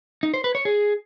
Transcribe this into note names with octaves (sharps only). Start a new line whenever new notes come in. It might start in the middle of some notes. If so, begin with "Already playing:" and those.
D#4
C5
B4
C#5
G#4